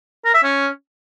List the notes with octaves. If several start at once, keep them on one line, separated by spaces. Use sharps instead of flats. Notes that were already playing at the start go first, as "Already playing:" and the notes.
A#4
E5
C#4